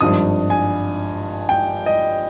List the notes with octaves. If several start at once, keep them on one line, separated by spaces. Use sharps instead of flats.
G#1 G2 F3 D#6
G#5
G5
D#5